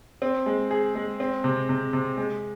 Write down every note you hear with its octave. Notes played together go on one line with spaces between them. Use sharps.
C4
G#3
G#4
G#3
C4
C3
C3
C3
G#3